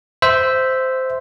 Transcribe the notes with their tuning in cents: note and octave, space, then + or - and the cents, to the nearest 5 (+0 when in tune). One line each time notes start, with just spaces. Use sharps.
C5 -10 E5 +0